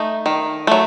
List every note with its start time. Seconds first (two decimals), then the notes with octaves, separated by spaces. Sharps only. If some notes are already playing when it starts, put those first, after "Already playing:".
Already playing: A3 D#4
0.26 D#3
0.67 F#3 A3